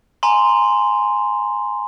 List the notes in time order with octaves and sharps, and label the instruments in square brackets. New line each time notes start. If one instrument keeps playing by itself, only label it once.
[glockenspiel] G#5 A#5 C6